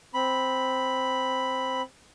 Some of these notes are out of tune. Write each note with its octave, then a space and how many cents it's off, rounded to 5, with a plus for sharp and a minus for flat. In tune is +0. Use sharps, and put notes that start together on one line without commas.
C4 +0 B5 +0